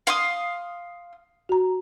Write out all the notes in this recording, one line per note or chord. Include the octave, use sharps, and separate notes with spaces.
F5 C6 D#6
F#4 A#5